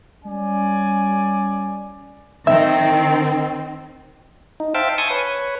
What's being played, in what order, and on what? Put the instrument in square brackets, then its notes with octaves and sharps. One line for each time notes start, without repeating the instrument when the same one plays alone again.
[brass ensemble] G3 C#4 D5 G#5
[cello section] D#3 [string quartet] C4 [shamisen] E5
[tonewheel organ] D#4
C5 E5 F5 G5 A5
G#5 A5 C6 C#6 D#6
B4 C#5